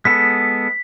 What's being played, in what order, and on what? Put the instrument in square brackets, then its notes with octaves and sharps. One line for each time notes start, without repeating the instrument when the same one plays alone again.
[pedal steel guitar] G#3 B3 A4 [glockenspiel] B6